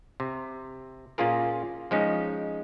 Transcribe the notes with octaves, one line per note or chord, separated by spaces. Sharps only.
C3
A#2 A#3 C#4 F4 G#4 A#4
F3 G#3 C#4 D#4